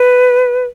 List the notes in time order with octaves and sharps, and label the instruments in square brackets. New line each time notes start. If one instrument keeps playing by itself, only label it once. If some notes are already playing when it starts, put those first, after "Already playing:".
Already playing: [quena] B4